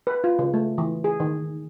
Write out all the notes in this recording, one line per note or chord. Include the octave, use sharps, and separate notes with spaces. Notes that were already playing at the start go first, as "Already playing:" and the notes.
B4
F4
C#3
A3
E3
G#4
D#3